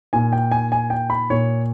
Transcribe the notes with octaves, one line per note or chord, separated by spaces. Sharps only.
A#2 G#5
G5
G#5
G#5
G5
B5
A#2 C#5